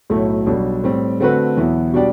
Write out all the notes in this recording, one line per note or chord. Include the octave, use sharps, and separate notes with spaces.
B1 A2 F#3 A3 E4
B1 B2 G3 D4
A2 G3 C4
D3 A3 C4 F#4 B4
E2 B2 F#3 B3 E4
B2 G3 D4 G4 D5